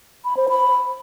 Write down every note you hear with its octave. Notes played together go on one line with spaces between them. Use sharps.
B5
C5
B5